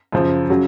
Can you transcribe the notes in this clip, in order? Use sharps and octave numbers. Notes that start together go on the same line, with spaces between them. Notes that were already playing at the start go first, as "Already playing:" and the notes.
F#2 C#3 F3
C#3 F#3